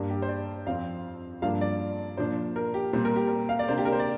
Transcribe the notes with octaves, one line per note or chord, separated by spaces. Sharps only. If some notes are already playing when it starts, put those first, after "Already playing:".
Already playing: G2 G3 A#3 D4
G4
C5
D5
F2 F3 C4 F5
G2 F3 A#3 D4 F5
D5
A#2 F3 D4 C5
A#4
G4
A#2 G3 C4 C5
A#4
G4
A#4
F5
D5
C3 A#3 D4 C5
G4
A#4
C5
D5